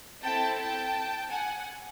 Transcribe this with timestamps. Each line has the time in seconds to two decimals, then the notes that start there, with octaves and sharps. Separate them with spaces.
0.22 C4 E4 A4 G5 A5
0.58 G5 A5
1.30 F#5 G#5